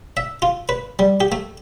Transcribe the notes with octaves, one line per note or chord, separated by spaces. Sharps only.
E5
F4
B4
G3
G4
A3